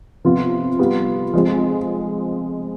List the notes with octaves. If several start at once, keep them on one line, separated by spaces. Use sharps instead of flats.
C3 F3 B3 F4
G3 B3 F4
F3 G#3 C4